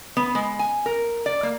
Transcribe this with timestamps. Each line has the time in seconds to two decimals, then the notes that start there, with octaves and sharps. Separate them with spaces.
0.17 B3
0.35 G#3
0.59 G#5
0.86 A#4
1.26 D5
1.43 A#3